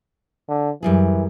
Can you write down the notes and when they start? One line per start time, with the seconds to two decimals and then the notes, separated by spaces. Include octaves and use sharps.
0.48 D3
0.83 F#2 E3 G3 G#4